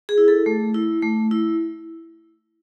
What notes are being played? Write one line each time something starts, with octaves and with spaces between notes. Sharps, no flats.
G#4
E4
A4
A3
E4
A3
E4